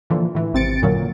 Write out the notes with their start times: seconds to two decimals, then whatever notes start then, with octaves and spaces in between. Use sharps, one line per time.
0.10 A#2 D3 E3 F3
0.35 A2 E3
0.53 G#1 C3 C4 A6 C#7 D7
0.82 F#2 A#2 D3 F#3 A#3